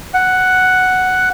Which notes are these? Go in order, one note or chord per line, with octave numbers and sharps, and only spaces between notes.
F#5